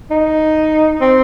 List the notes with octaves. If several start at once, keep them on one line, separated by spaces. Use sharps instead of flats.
D#4
C4